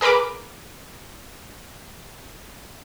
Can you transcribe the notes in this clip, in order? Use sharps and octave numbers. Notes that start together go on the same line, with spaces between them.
G#4 A#4 B4 B5 D6